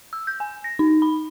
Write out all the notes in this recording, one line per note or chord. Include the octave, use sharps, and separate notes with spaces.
E6
G6
G#5
A#6
D#4
B5